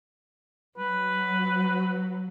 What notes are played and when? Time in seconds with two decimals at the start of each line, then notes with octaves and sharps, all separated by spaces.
0.78 F#3 B4